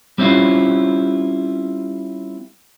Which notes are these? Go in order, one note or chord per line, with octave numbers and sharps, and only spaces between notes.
G3 C4 C#4 E4 F4